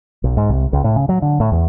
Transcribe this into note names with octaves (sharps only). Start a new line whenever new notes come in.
B1
G#2
C2
C#2
A2
C#3
F#3
D3
A2
E2